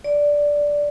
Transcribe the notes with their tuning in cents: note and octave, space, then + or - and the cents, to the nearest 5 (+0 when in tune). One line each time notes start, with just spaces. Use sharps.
D5 -5